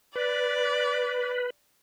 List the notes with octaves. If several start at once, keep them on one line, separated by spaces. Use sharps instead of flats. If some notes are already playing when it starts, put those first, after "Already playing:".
B4 D5